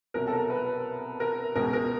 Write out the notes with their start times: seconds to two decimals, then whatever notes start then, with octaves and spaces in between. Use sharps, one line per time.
0.14 C2 B2 F#3 A#4
0.27 A4
0.32 A#4
0.50 B4
1.20 A#4
1.56 C#2 B2 G#3 A#4
1.73 A#4